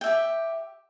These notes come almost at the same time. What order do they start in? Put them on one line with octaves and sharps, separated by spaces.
G5 E5 G4